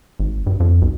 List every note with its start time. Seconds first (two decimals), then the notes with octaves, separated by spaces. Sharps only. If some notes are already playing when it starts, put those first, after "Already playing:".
0.20 G#1
0.47 G2
0.60 F2
0.82 B1